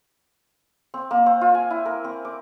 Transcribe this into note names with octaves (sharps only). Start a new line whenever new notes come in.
C4
A#3
C4
F4
G#5
E4
A#4
C4
D6